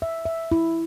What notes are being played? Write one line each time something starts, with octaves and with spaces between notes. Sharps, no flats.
E5
E5
E4